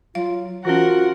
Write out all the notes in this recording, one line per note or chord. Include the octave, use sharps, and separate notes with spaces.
F#3 F4 F5
E3 C#4 F4 F#4 A#4 F#5